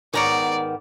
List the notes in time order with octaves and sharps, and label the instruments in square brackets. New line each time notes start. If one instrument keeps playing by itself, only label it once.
[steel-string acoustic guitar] G#2 D#3 B3 [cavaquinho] C#5 A#5 D#6 [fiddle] D5